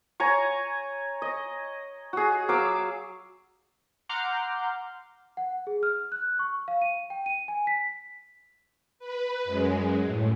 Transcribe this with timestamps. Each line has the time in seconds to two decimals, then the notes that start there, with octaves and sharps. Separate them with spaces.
0.20 C#5 G#5 A#5 C#6
1.22 D#5
2.13 F#4 G#4
2.48 F#3 F5 D6 E6
4.09 F#5 A#5 C6 D6 F6 G6
5.37 F#5
5.67 G#4
5.83 F6
6.12 F#6
6.39 C#6
6.68 F5
6.82 D#7
7.10 G5
7.26 D#7
7.48 G#5
7.67 B6
8.99 B4
9.45 F#2 G#3
10.04 A2